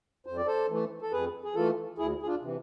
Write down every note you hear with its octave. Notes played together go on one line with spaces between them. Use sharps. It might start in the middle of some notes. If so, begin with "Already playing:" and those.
F2 C5
D5
A4 C5
E3 A3
A4
F2 G#4 B4
G#4
E3 A3 F4 A4
D2 E4 G#4
G#4
D4 F4
C3 E3